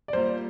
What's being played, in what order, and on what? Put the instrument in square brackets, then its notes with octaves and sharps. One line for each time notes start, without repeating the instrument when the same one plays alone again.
[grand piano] D5
[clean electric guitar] G3 A#3 F4 [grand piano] C5